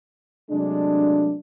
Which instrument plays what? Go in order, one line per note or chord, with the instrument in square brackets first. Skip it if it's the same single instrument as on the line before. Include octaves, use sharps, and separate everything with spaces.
[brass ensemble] C3 F#3 G#3 A3 D4